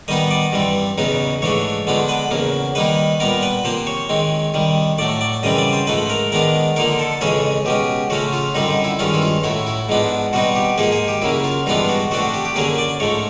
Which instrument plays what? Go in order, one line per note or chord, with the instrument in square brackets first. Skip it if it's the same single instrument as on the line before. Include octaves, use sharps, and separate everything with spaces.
[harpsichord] D#3 G3 B3 D#4 D#5
D5
G2 E3 G3 C4
E2 C#3 F#3 B3 D#4
G#2 E3 A3 D4 C#5
D3 F3 G#3 B3 D4
B4
E2 C#3 F#3 A#3
D#3 G3 A#3 D#4 B4
A#2 G3 B3 A#4
B4
C3 F3 A#3 C5
C#5
D#3 G#3 C4
C3 D#3 G3
A2 F#3 A3 D5
D5
F#2 C#3 E3 G3 C4 D#5
D5
C5
G#2 F3 A3 B4
A#4
D#3 G#3 B3 D4 A#4
D3 F3 A#3 D#4 A#4
A4
F2 C#3 E3 G#3 C#4 G#4
B2 G#3 C#4 G4
C#3 F3 A3 C#4 F#4
F4
F#2 D3 G3 C4 D#4
D#4
E4
G2 D#3 G#3 C#4 F4
E4
F4
A2 F#3 A3 E4
E4
G#2 F3 G#3 B3 D4
B2 G3 C4 D#4 F#4
G4
G#2 F3 A#3 D#4 G#4
G#4
G4
F#2 C#3 F#3 A#3 E4
F4
G2 E3 G#3 B3 D4 F4
F#4
C3 F3 A3 D4 F#4
F#4
G4
G4
F#2 D3 F#3 A#3 G#4
D5
G#2 F3 A3 C#5